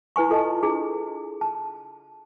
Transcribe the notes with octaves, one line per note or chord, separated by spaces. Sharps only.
E4 B4 G#5 C#6
F4 A4 D#5 A5
D4 E4 G#4 A4
A5